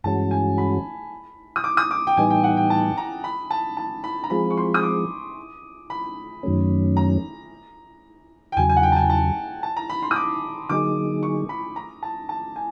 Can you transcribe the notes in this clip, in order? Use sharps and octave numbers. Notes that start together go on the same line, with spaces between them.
G2 E3 G#3 C#4 F#4 A5
G#5
B5
D#6
D6
D#6
D6
G5
A2 E3 G3 B3 D#4 G#5
G5
F#5
G5
A5
A#5
B5
A5
A5
B5
A#5
F3 G#3 C4 F4 G#4 B5
C#6
C6
D#6
D6
B5
F#2 D#3 F#3 A3 C#4
A#5
G5
E2 C#3 F#3 G#5
G#5
F#5
G5
A5
G#5
A5
A5
A#5
B5
C6
D#6
D6
D3 F#3 A#3 D#4 G#4 D6
C#6
B5
A#5
A5
A5
G#5